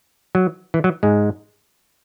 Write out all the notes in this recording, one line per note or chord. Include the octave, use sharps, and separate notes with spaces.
F#3
E3
F#3
G#2 G#3